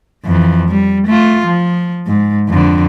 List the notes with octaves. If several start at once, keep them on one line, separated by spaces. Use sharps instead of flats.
F2 E3
G3
A3 F4
F3
G#2
F2 D3